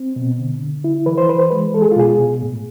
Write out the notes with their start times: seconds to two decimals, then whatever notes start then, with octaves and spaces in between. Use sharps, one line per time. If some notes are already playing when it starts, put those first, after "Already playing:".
Already playing: C4
0.16 B2
0.39 D3
0.61 D3
0.84 E4
1.06 E3 B4
1.18 C5
1.29 E3 B4
1.39 C5
1.50 G#3 B4
1.74 G#3 A4
1.82 G#4
1.91 F4
1.96 B2 G#4
2.19 B2
2.42 A2